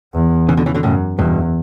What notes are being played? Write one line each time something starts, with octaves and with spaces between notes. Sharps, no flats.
E2
C#3 E3
B2 D3
C#3 E3
B2 D3
F#2 A2 C#3
E2 G2 B2